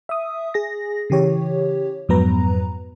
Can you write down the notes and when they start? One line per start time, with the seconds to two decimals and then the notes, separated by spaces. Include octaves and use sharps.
0.09 E5 D#6
0.54 G#4 A#6
1.10 C#3 E3 G4 C#5
2.09 F2 G#2 F#3 B3 B4 A#5